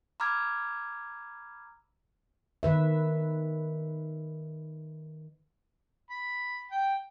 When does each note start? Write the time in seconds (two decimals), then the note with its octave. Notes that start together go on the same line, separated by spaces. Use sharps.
0.20 A#5 B5 D6 E6 F6 G#6
2.63 D#3 B4 E5
6.10 B5
6.71 G5